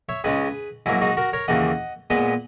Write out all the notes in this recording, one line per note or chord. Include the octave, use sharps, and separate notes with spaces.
C#5 E5
C#2 C#3 G#3 C#4 G#4 B4
G#2 F#3 A#3 E4 G#4
D#4 F#4
F#4 A#4
A#4 C#5
D#2 C#3 E3 A#3 D#5 F#5
A#2 G#3 B3 B4 D#5